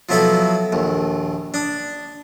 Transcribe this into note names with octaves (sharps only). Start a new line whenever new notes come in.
F3 F#3 B3 E4 A4 D#5
A#1 D#2
D4 D#6